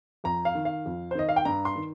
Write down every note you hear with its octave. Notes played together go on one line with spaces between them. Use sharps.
F2 A#5
F5
D#3
F5
F2
C5
D#3 D#5
F5
G5
G2 A#5
C6
D#3